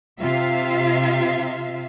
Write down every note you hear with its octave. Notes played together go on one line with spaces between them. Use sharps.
C3 F4 E5 F5